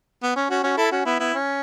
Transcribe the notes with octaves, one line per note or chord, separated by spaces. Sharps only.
B3
C#4
C#4 F#4
C#4 F#4
E4 A4
C#4 F#4
B3 E4
B3 E4
C#4